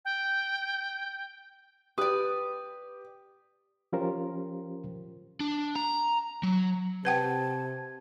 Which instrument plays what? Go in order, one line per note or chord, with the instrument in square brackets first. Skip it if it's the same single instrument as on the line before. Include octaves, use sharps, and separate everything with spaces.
[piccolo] G5
[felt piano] G4 [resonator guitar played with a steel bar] B4 D5 [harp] D#6
[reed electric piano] F3 C#4 F4 G4 A#4 C5
[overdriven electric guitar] D4
A#5
F#3
[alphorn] C3 [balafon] B4 F#5 G5 [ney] A5 [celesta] G#6